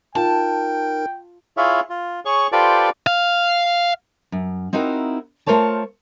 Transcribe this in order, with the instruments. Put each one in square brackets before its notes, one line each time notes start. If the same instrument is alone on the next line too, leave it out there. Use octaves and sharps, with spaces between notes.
[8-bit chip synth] D#4 A#4 [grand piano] F4 [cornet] G5 [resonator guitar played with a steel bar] A5
[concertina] E4 F4 G#4 C#5 E5 F5
F4
G#4 C#5 C#6
F4 G4 A4 B4 C5 D5
[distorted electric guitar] F5
[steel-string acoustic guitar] F#2
C4 D#4 E4 F#4 A#4
A3 F4 A#4 C5 C#5 A5